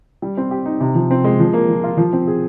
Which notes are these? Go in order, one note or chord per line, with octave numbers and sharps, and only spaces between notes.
G3
C4
G4
D#4
C3
F3
C4
G#3
F3
A#3
F3
F4
F3
C4
G#4